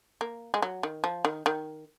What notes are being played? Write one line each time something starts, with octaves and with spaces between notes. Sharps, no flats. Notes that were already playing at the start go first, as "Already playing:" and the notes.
A#3
G#3
F#3
D#3
F3
D#3
D#3